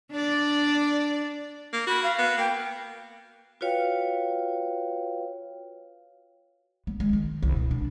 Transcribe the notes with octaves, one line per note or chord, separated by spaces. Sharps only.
D4 D5
A#3
F#4 B5
F5
B3
A#3 G5
F4 F#4 B4 C#5 F5 G5
B3
G#3
D#3
C2
B2
D4